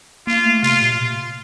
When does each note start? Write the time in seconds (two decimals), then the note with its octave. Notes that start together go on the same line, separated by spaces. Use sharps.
0.27 A#3 F4
0.45 A3
0.63 C3 F4
0.82 A#2